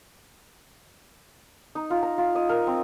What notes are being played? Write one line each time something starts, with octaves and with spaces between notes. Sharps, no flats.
D#4
F4
A#5
F4
D#5
A#4
C4